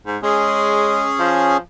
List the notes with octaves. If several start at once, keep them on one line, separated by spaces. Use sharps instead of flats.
G#2
G#3 C#4 G#4
F3